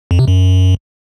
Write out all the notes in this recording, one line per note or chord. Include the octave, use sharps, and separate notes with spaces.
F2
C3
F#2